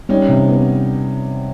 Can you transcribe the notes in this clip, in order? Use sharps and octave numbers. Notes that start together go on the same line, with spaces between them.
G3 C#4 D#4
C3
B3